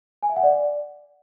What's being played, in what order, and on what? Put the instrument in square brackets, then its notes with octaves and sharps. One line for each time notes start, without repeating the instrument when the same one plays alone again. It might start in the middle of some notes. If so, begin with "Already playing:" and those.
[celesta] G#5
E5
F#5
D5